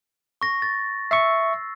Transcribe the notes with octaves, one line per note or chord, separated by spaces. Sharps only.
C#6 A#6
A6
E5 C#6 E6 C7